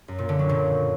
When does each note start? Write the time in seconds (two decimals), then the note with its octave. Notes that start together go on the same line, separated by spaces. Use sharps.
0.08 F#2
0.18 A#2
0.29 D3
0.39 F#3
0.49 A#2